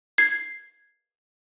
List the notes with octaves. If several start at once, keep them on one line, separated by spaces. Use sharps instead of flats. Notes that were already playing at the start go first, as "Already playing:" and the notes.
G#6 C7